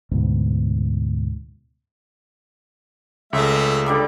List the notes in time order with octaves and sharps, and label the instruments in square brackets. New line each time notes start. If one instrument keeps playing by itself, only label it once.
[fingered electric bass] D2 G#2 B2
[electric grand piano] C#2 [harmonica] G#3 A3 E5
[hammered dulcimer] D3 G3 D6